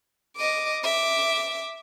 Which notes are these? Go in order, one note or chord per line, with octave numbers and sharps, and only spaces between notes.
D#5 D6
E5 D6